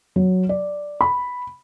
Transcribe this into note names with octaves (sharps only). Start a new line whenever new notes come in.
F#3
D5
B5